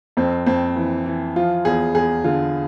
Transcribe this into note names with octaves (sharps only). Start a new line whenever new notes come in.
F2 C4
F2 C4
E3
E3
F3 F4
E2 G#4
E2 G#4
D3 F4